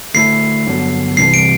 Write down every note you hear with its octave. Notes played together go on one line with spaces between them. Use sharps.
D3 A3 E4 A4 C5 C7
G1 G2 D3 F#3 B3
C2 C3 E3 G3 D4 C7
D7